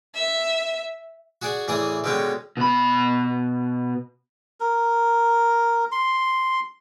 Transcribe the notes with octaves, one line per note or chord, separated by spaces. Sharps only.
E5
F#4 G#4 D5 F#5
A1 E3 G#4 D5 D#6
B2 D3 G#3 B3 C#4 G4
B2 B5
A#4
C6